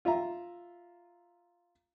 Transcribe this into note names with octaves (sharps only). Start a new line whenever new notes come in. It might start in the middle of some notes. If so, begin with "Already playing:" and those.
F4 E5 A#5